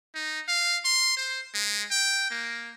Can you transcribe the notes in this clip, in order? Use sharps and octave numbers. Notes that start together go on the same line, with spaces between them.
D#4
F5
C6
C5
G#3
G5
A#3